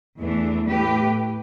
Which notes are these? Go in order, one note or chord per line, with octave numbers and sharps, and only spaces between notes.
E2 E3 A3 D4
A2 A3 G4 B4